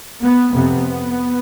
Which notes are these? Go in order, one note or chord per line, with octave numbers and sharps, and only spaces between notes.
B3
F2 C3 B3